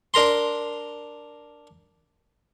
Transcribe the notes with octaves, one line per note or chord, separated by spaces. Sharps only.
D4 A#4 A#5 C6